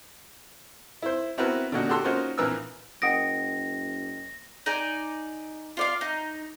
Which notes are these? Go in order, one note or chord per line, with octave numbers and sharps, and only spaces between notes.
E4 C5
B3 C4 E4 F#4 A#4 B4
A#2 D3 C#4 D#4 F#4
F#4 G4 A4 A5 C6 E6
A#3 C#4 D#4 F4 F#4 C5
A#1 E3 A#4 B4 E6
F#1 A#4 D#5 F#5 G5 D#6 A#6 D7
D#4 D5 G#5
F4 D5 F5
D#4